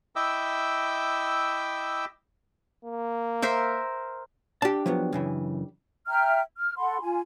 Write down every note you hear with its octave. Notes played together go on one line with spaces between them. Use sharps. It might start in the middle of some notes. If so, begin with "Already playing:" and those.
E4 D#5 E5 G5 D6 E6
A#3
A#4 C5 E5
D4 G4 A5
F3 F#3 B3
F#2 C#3 E3
E5 G5 A#5 F6
F6
A4 F#5 B5 C6
F4 G#5